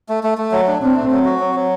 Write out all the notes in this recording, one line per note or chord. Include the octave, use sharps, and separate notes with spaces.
A3
A3
A3
F#3
D4
C4 D4
A3
F#3
F#4
F#3
F#3